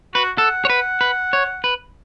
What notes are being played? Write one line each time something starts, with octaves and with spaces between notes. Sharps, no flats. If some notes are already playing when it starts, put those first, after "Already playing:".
F#4 B4
A4 F#5
C#5
B4
B4
C#5
B4